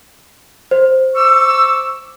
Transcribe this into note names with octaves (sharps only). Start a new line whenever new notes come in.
C5
C#6 D6 E6